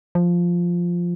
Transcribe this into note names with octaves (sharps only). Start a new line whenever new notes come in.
F3